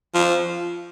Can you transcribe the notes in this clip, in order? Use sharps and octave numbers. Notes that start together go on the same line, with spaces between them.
F3